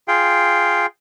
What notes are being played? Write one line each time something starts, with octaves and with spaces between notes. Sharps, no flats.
F4 G#4 F5 G5